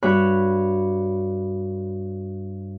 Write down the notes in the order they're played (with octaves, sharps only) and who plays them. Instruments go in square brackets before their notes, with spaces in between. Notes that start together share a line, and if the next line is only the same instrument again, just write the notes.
[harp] G2 F#4 C#5 B5 F#6